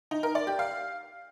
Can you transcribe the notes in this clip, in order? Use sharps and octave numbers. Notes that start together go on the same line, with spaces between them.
D#4
A#4
D5
G4
F5